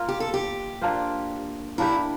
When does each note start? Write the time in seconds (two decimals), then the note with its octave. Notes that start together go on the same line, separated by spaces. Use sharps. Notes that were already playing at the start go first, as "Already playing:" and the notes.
Already playing: A#3 F4 A#4
0.09 G4
0.20 A4
0.34 G4
0.82 A#3 D4 F4 C5
1.78 A#3 D4 E4 G4